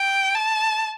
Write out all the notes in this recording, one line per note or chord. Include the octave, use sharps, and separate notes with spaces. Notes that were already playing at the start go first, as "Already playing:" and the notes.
Already playing: G5
A5